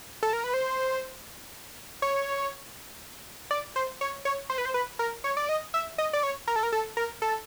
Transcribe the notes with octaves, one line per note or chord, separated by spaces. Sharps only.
A4
A#4
B4
C5
C#5
D5
C5
C#5
C#5
C5
B4
C5
B4
A#4
C#5
D5
D#5
E5
D#5
D5
C#5
A#4
A4
A#4
A4
A#4
A4